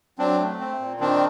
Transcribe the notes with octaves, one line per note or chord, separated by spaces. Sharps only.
F#3 C4 D4
A3
C4
A#2
D#3 C4 D4